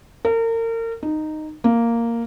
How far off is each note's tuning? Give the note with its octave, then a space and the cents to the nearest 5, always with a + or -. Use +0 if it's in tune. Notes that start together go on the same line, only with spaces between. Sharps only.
A#4 -35
D#4 -10
A#3 -5